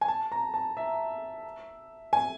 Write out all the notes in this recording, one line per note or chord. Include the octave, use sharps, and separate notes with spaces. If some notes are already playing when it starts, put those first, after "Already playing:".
G#5
A5
A#5
A5
E5
G#5